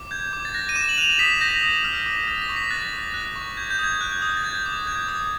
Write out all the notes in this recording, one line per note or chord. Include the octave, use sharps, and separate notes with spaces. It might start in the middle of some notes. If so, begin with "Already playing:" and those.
Already playing: D6
G6 G#6
D6
A6
F#6 A#6
D#7
D6 E7
F#7
F#6 F7
D#6 B6
G6 A#6
D#6
F6
D6
F6 A6
A#6
C#6
B6
F#6 A6
C#6
A6
F#6
C#6
G6 G#6
G6
D#6 G#6
F#6
D#6
A6
G6 G#6
D6
F#6 G#6
D#6